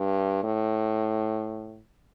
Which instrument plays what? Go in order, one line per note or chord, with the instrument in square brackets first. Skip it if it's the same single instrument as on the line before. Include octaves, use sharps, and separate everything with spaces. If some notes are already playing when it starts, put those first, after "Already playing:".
Already playing: [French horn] G2
A2